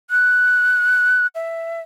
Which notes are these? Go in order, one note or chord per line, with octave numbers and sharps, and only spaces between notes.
F#6
E5